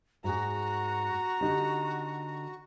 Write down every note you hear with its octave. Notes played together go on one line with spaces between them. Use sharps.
G#2 F#4 G#4 A#5
D3 D#4 G4